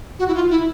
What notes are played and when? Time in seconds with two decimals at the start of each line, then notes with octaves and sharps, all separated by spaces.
0.19 F#4
0.28 E4
0.35 F4
0.51 E4